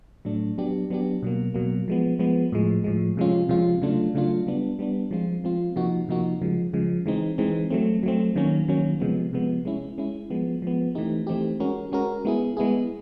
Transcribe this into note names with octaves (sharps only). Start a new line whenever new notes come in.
A2 F#3 A3 D4
F#3 B3 D4 G4
F#3 B3 D4 G4
B2 F#3 A#3
B2 F#3 A#3
F3 G#3 B3
F3 G#3 B3
A2 F3 G#3
A2 F3 G#3
C3 F3 G#3 C#4 F4
C3 F3 G#3 C#4 F4
C#3 F#3 A3 D4 F4
C#3 F#3 A3 D4 F4
G3 B3 D4
G3 B3 D4
F3 G#3 C4 F4
F3 G#3 C4 F4
C3 F3 A#3 D#4 F#4
C3 F3 A#3 D#4 F#4
C#3 F3 G#3
C#3 F3 G#3
E3 G#3 C4 D#4
E3 G#3 C4 D#4
F#3 A3 C4
F#3 A3 C4
D#3 F#3 A#3 C#4
D#3 F#3 A#3 C#4
C3 F3 G#3 B3
C3 F3 G#3 B3
G#3 C#4 E4
G#3 C#4 E4
F3 G#3 B3
F3 G#3 B3
E3 A3 C4 D#4 G4
E3 A3 C4 D#4 G4
G#3 C#4 F#4 A#4
G#3 C#4 F#4 A#4
G#3 B3 E4 G#4
G#3 B3 E4 G#4